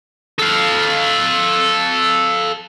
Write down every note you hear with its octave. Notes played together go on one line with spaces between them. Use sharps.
A4 F5